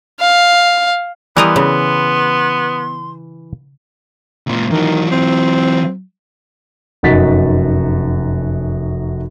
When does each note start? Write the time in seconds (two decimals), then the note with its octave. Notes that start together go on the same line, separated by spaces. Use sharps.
0.20 F5
1.37 E3 G3 B3 A#4 D#5 C6
1.56 C#3
4.47 C#2 A#2
4.71 D#3 E3 F#3
5.11 C4
7.03 F1 F#2 D#4 F#4 A6 B6